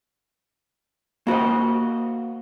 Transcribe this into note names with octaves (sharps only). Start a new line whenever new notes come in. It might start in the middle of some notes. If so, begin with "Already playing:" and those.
A#3 F#4 C5 D#5